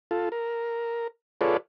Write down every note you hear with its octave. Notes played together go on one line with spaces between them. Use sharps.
F4 A4
A#4
F4 G#4 A4 B4 C#5 D5